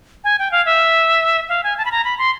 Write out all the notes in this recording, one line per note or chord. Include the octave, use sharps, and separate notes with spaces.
G#5
G5
F5
E5
F5
G#5
A5
B5
A#5
B5
C6